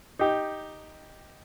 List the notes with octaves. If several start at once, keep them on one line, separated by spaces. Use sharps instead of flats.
D#4 G4